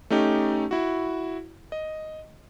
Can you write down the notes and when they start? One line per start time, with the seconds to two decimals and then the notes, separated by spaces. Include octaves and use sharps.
0.10 A3 C#4 D#4 G4
0.71 E4 F#4
1.72 D#5